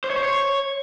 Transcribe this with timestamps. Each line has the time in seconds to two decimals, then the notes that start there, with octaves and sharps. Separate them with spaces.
0.04 C5
0.10 C#5
0.17 C5
0.23 C#5